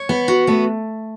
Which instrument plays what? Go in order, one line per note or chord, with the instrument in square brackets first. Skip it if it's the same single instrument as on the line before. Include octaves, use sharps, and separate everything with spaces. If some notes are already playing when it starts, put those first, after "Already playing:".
Already playing: [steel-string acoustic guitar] C#5
B3
F#4
[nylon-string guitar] A3 [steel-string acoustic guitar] B3